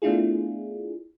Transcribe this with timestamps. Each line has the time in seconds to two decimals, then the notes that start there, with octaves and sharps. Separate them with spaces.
0.02 A3 B3 D4 E4 F4 G#4